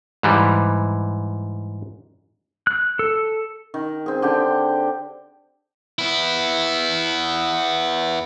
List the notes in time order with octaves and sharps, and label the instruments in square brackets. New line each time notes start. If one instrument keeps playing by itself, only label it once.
[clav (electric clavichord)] G#2 E3 G3
[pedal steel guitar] F#6
A4
[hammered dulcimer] D#3
C4 G#4
D3 G4 G5
[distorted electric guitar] B3 E4